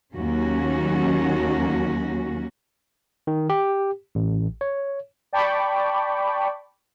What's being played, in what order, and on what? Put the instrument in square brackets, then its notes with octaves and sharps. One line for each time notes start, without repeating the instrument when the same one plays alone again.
[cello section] D#2 F#3 A#3 C#4 F#4
[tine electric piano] D#3
G4
A1
C#5
[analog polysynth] D5 G5 A5 B5 C#6 D6